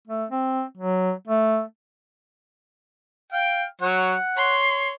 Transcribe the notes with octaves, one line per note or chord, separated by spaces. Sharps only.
A3
C4
F#3
A3
F5 G5
F#3 C#5 F#5
C#5 C6